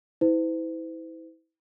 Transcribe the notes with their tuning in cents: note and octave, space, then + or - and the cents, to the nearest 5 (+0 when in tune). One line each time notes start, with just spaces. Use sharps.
E4 -30 C5 -45